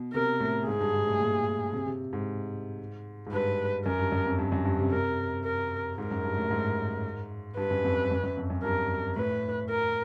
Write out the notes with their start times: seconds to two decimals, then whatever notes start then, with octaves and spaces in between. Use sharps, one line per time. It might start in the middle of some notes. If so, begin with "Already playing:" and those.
Already playing: B2
0.14 C3 A#4
0.40 A2
0.67 G#2 G#4
0.81 G2
0.93 G#2
1.07 A2
1.20 A#2
1.73 C3
1.87 C3
2.13 G#2
3.27 G#2
3.32 G2 B4
3.86 F#2 A#4
3.99 G2
4.12 F#2
4.26 F2
4.39 G2
4.52 F#2
4.65 G2
4.79 C3
4.92 A#4
5.45 A#4
5.98 G#2 A#4
6.11 F#2
6.25 G2
6.38 A2
6.51 G#2
7.57 G2 B4
7.71 F#2
7.84 F2
8.11 F#2
8.23 F#2
8.37 F2
8.50 F#2
8.63 G2 A#4
9.16 A2 B4
9.70 A#4